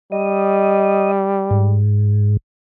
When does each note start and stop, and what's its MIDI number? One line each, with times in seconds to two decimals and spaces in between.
0.12 1.80 55
0.12 1.11 75
1.51 2.37 44